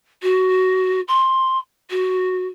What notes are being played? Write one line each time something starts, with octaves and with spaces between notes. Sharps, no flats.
F#4
C6
F#4